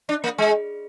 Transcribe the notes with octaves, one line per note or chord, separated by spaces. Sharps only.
D4
A#3
G#3